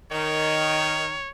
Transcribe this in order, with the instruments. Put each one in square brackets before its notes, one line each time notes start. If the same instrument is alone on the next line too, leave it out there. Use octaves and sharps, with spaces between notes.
[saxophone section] D#3 [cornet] C#5